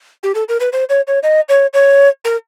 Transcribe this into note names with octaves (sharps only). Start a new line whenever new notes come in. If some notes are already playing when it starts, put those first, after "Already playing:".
G4
A4
A#4
B4
C5
C#5
C#5
D#5
C#5
C#5
A#4